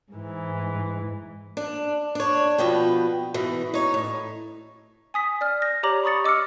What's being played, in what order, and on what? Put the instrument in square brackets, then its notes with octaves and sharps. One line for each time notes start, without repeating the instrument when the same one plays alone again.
[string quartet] G#2 E3
[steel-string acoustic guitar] D4
D4 C#5
B2 F3 B3 G5
B2 E3
D#4 C#5
A2
[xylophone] G#5 D#6 B6
D5 F6
G6 A#6
G4 C#5 D5 A#5 D6 F#7
B5 C#6 D#6 A6 C#7
D#5 D6 E6 F6 C#7